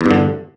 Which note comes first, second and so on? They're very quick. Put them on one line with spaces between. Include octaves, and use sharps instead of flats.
E2 G2 D3